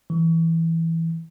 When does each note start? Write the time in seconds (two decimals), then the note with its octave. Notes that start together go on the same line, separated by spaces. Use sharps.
0.10 E3